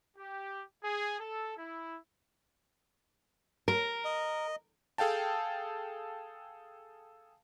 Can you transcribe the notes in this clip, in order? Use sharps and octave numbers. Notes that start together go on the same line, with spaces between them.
G4
G#4
A4
E4
A#4
D#5
G#4 A4 F5 G5 A5